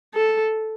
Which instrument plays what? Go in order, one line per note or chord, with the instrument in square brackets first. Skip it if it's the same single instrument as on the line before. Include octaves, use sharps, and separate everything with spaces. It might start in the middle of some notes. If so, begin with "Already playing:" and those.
[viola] A4